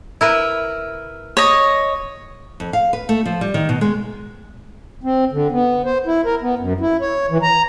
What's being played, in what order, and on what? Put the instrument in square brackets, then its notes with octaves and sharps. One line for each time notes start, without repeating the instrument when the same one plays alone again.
[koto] E4 A#4 B4
[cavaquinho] C#5 D#5
[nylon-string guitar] F2
F5
B4
A3
F3
G3
D#3
B2
G#3
[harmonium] C4
D3
B3
C5
E4
A#4
B3
F#2
E4
C#5
E3
A#5